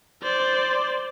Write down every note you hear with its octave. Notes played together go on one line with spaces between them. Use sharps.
C5 D5